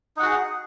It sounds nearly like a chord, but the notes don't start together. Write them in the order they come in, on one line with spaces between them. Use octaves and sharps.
D#4 F#5 F#4 G#4